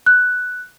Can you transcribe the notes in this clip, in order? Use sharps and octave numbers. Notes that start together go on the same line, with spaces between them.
F#6